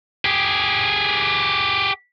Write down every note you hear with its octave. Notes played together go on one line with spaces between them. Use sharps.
G4 G#4